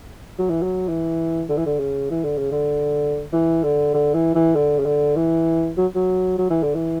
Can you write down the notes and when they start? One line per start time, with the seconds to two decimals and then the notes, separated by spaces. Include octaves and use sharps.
0.38 F#3
0.50 E3
0.62 F#3
0.88 E3
1.49 D3
1.57 E3
1.66 D3
1.79 C#3
2.10 E3
2.24 D3
2.38 C#3
2.52 D3
3.32 E3
3.63 D3
3.94 D3
4.14 E3
4.35 E3
4.55 D3
4.79 C#3
4.85 D3
5.16 E3
5.77 F#3
5.95 F#3
6.38 F#3
6.50 E3
6.62 D3
6.75 E3